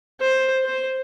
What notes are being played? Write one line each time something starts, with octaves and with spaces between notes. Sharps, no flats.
C5
C5